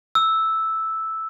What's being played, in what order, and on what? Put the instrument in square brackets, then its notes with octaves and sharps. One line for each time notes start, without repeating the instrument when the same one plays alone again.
[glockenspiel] E6